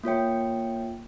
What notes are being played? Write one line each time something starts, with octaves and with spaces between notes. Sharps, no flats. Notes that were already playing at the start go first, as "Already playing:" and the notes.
A#3 F4 C#5 G5